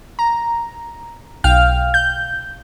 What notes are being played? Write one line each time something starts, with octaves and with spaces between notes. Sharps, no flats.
A#5
B1 F5 G5 F6
G6